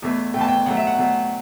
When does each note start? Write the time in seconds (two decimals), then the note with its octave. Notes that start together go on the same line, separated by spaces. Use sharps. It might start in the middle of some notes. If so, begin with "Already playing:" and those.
0.02 E2 B2 A3
0.34 A3 G5
0.37 E2 B2 A5
0.49 G5
0.66 B2 F#3 A3 F#5
0.77 E5
0.87 F#5
0.98 B2 F#3 A3